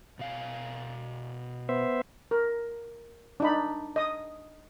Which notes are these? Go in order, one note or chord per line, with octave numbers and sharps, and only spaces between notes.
B2 F5 G#5
B3 C5 E5
A#4
D4 D#4 B5
D#5 D#6